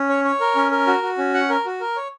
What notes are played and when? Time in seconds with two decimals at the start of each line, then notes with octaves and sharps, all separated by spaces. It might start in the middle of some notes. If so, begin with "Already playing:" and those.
Already playing: C#4
0.09 C#5
0.25 C#5
0.40 A#4
0.56 C#4
0.71 A#4
0.87 F#4
1.02 F#4
1.18 C#4
1.34 F#5
1.50 A#4
1.65 F#4
1.81 A#4
1.96 C#5